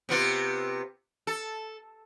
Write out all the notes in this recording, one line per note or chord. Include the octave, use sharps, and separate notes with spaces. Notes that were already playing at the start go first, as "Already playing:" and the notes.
C3 B3 F4
A4